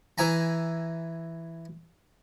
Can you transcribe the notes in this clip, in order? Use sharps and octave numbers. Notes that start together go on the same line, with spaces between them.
E3 E4 G#5 A#5